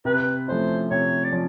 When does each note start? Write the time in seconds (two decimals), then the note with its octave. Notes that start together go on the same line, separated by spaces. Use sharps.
0.05 C3 B4
0.48 F3 A3 C#4 E4 C5
0.91 C3 C#5
1.24 D5
1.32 F3 C#4